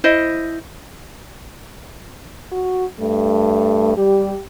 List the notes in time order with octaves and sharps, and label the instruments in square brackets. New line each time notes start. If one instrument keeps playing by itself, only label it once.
[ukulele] E4 C5 D#5
[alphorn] F#4
[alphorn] G2 [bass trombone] A3
[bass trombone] G3 [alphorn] G4